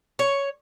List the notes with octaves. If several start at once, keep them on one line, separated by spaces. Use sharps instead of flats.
C#5